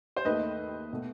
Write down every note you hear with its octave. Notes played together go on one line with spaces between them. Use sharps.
C5
D#2 D#3 A3 B4 D#5
B2 A3